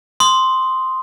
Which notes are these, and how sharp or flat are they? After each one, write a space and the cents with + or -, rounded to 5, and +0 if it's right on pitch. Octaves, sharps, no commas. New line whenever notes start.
C6 +0 D#6 +0